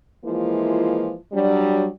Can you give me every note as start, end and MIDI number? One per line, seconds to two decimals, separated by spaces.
0.25 1.14 52
0.25 1.14 53
0.25 1.14 56
0.25 1.14 58
0.25 1.14 64
0.25 1.14 65
1.33 1.86 54
1.33 1.86 55
1.33 1.86 62